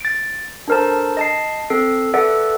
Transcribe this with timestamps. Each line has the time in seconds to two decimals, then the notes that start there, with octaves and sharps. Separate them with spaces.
0.01 A6 D7
0.68 D4 A4 A#4 C5 A5
1.17 D#5 A5 C7
1.70 C4 A4 C7
2.14 A4 B4 D5 E5 F#5